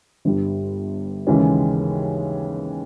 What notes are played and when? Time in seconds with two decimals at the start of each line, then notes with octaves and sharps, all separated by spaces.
0.25 G1 G2 G3
1.27 D#2 C#3 E3 G#3 C#4